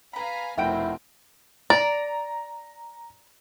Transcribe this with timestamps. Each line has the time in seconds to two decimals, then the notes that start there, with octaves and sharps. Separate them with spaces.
0.13 B4 F5 G#5 A#5 B5
0.58 F1 B2 A#3 C4 E4 F#4 G5 D7
1.70 D5 A#5